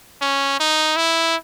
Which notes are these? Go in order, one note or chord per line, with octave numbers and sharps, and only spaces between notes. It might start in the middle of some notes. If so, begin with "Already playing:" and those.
C#4
D#4
E4